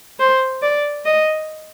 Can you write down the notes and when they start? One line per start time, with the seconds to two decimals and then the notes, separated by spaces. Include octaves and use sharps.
0.19 C5
0.62 D5
1.05 D#5